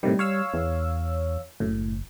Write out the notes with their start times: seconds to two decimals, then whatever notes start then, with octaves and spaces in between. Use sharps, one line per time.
0.03 A2 C3 D#3 G3
0.19 C#5 F5 E6
0.54 E2
1.60 F#1 A2